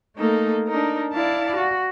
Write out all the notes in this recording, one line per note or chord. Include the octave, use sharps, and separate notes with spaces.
A3 A#3 D#4 A4
D4 D#4 A#4
E4 D5 F5 A5
F#4